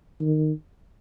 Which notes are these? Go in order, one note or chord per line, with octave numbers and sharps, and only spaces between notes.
D#3